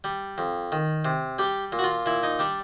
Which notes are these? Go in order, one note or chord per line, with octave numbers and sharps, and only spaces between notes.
G3
F2
D#3
C3
G3 G4
A#2
F#4
F4
A#2 E4
D#4
G3 D4